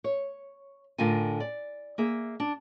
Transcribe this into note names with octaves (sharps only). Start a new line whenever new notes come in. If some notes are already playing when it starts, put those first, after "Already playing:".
C#5
A2 D3 F4 A#4 G#5
D5
A#3 G#4 E5
D4